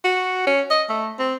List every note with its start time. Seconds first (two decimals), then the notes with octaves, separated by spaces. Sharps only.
0.04 F#4
0.47 C#4
0.70 D#5
0.89 A3
1.19 C4